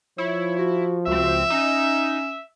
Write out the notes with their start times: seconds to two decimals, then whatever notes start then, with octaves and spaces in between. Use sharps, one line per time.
0.18 F3 E4 C#5
0.59 F#4
1.07 C#2 C4 F#4 E5
1.50 C#4 D#4